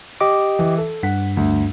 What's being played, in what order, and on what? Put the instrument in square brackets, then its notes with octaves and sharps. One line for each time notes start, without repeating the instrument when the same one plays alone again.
[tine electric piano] G4 D#5 D6
[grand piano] E3
A4
[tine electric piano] G2 [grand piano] F#5 B6
[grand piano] D2